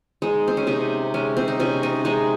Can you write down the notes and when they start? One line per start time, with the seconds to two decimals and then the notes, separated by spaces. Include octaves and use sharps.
0.22 G#3 D#4
0.48 C4
0.57 C#4
0.67 C3 D#4
1.14 G#3 C#4
1.37 C4
1.48 D#4
1.59 C3 C#4
1.83 D#4
2.05 G#3 D#4